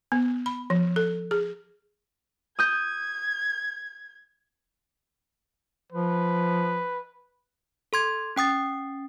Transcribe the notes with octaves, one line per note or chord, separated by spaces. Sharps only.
B3
B5
F3
A4
G#4
D#6 G6 G#6
F3 B4
A4 C6 G#6
C#4 G5 D#6 A6 C7